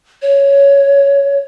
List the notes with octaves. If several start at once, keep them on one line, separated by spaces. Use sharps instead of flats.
C#5